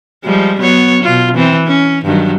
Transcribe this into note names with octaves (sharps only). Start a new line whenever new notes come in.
F3 G3 G#3
F#3 B3 C#5
B2 F4
E3 C4
C#4
G2 D#3 F#3